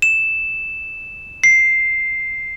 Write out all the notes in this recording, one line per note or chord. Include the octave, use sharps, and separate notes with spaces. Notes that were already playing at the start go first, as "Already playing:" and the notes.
E7
C7